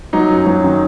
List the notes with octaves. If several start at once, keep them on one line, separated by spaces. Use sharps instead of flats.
F#3 D#4
F#2
F#3
D#3